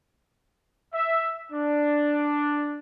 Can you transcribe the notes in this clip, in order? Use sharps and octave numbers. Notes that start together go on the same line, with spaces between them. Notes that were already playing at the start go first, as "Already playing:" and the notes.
E5
D4